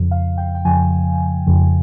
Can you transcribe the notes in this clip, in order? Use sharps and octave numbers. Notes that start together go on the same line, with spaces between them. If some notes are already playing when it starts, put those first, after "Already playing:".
Already playing: F2 C#3 F3
F5
G5
G5
F2 C#3 F3 G#5
F2 C#3 F3